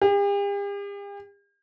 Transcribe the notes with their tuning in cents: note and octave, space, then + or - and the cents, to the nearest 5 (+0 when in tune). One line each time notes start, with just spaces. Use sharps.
G4 +45